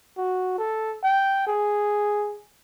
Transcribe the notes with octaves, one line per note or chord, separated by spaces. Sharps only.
F#4
A4
G5
G#4